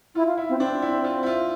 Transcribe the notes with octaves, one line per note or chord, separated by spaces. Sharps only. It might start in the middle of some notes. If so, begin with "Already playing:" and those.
E4 F4
F4
E4
C4
C4 D4
E4
F4
E4
F4